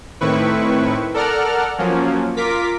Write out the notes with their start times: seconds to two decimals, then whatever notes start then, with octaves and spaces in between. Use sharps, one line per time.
0.21 A2 D#3 C4 E4 B4 C#6
1.14 A4 A#4 D5 F#5 A#5 F6
1.78 F3 F#3 A#3 C#4
2.36 F4 A#4 D6 B6